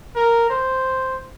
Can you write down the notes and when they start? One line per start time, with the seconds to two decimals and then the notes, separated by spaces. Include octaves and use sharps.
0.16 A#4
0.50 C5